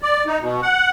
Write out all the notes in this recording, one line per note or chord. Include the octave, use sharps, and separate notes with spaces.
D5
D#4
B2
F#5